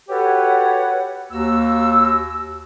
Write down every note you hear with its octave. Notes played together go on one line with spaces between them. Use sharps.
F#4 G4 A4 B4 C#5 F#5
D#2 A#3 F#4 E6